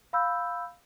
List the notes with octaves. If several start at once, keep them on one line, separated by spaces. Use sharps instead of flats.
F5 B5 E6 G6